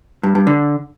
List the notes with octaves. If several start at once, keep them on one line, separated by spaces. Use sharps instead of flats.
G2
G2
D3